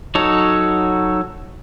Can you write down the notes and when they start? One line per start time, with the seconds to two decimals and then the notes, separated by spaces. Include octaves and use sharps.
0.15 F#3 D#4 A4 C#5